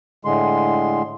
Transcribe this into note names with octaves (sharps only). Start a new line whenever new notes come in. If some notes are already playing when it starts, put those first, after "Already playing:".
A2 D3 G#3 C6